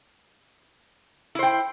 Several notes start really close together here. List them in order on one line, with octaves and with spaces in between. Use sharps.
E4 C5 G5